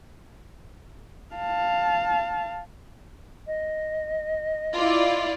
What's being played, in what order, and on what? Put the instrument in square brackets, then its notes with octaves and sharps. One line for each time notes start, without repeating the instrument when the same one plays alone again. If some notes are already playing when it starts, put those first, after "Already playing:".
[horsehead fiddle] F5 A5
[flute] D#5
[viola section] E4 D5 [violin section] F4